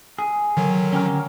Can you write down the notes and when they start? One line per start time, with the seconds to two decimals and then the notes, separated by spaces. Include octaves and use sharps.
0.19 G#4
0.57 D3 D#3 F#3
0.93 C#4 G4 A#4